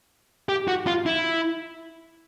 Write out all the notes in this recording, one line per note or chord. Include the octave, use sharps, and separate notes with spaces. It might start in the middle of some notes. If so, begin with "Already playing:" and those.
G4
F#4
F4
E4